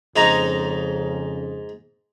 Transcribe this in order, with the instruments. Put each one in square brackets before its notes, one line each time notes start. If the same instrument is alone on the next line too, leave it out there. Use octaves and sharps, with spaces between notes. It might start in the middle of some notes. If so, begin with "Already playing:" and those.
[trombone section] F2 C#3 [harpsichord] G#2 D#4 A#5